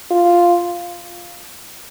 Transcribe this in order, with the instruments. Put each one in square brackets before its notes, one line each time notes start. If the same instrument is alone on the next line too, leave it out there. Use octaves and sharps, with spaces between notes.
[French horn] F4